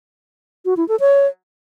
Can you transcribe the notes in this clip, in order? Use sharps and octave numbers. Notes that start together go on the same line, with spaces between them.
F#4
E4
A4
C#5